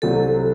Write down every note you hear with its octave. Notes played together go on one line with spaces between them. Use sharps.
C2 C3 F#3 C4 A4